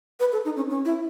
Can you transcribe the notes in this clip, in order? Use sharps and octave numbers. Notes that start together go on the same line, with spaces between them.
B4
A4
D#4
C#4
C#4
E4